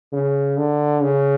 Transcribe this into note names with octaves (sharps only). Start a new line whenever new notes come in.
C#3
D3
C#3